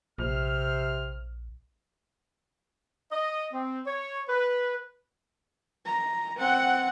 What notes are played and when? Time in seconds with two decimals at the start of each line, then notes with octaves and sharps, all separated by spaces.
0.18 A#1 C3 C5 F6
3.12 D#5
3.53 C4
3.86 C#5
4.28 B4
5.85 A#5
6.36 C4 F#5